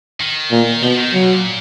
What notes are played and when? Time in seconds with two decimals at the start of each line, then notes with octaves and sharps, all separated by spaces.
0.20 D#3
0.52 A#2
0.83 B2 F3
0.97 D#3
1.14 C#3 F#3
1.23 B2
1.34 A#2